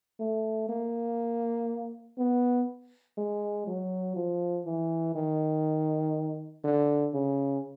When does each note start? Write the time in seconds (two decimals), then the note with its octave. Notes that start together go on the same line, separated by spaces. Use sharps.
0.19 A3
0.69 A#3
2.18 B3
3.17 G#3
3.67 F#3
4.16 F3
4.66 E3
5.15 D#3
6.64 D3
7.14 C#3